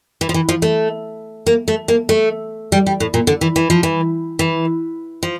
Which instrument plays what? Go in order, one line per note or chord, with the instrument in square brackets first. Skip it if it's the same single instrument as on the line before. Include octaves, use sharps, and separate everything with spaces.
[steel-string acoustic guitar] E3
F3
E3
F3
A3
A#3
A3
A#3
A3
G3
G3
A2
A#2
D3
E3
E3
F3
E3
E3
F3